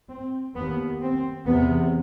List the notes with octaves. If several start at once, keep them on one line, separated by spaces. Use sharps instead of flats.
C4
D#2 B3
C4
E2 C3 B3